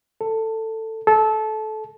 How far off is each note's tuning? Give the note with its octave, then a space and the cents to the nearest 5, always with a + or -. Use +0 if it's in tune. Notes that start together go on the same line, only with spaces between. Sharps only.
A4 +15
A4 -20